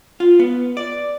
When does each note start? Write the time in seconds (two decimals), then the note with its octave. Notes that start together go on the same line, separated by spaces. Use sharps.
0.20 F4
0.39 B3
0.77 D5